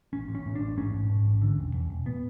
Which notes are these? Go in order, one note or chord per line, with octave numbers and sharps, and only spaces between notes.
A1 C#4
A1
C#4
A2
D4
A1
G#2 C#4
G#2
G#2
A1
D3
E1
E2
E1
A2 B3